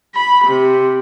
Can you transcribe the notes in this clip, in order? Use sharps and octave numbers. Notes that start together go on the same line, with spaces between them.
B5
C3